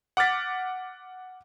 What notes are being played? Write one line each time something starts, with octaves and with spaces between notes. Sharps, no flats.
F#5 D6 F6 A6 B6